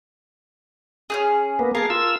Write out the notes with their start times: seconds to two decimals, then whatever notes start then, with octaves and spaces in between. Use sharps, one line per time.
1.10 C#4 G4 G#4
1.59 A#3 B3
1.75 G#4 A#4 F5 A5
1.90 F4 E6